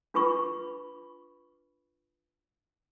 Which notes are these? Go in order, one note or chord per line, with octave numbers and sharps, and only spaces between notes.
D4 F4 B4 B5 C#6